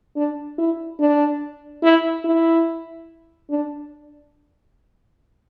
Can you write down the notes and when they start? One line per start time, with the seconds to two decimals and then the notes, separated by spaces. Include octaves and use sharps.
0.16 D4
0.58 E4
1.00 D4
1.83 E4
2.25 E4
3.50 D4